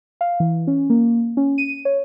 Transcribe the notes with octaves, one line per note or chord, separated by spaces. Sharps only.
F5
E3
C#4
A#3
C#4
D#7
C#5